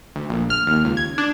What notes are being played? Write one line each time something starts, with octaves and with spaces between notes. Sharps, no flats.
D2
A#1
F6
D#2
C#2
G#6
D4